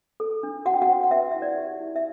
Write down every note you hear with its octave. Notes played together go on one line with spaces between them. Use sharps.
A4
D4
F#4 F#5
G5
F#4 F#5
C5
F#5
B4 E5
E4 E5
D5
G4
E4
E5